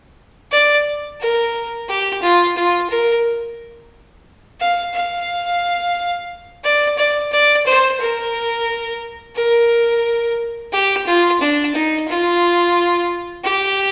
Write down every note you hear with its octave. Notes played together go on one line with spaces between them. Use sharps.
D5
A#4
G4
F4
F4
A#4
F5
F5
D5
D5
D5
C5
A#4
A#4
G4
F4
D4
D#4
F4
G4